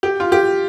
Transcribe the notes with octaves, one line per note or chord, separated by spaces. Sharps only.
G4
F4
G4